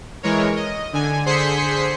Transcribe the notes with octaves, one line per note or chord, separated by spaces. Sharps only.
E3 G#3 A#4 C#5
D#5
D3 G#5
D3 G#4 C5 C6 B6 C#7